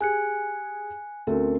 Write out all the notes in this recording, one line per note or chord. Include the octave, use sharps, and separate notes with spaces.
G4 G#4 G#5 F#6 C#7
D2 C4 C#4 A4 A#4